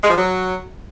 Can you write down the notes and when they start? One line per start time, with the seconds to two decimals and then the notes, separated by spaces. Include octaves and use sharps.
0.02 G#3
0.09 F3
0.16 F#3